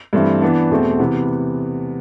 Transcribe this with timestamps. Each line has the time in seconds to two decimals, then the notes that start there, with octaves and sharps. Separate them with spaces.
0.13 G2 E3 A3 C4 E4
0.41 E3 B3 D4
0.71 E2 B2 A3 C4
0.99 C3 E3 B3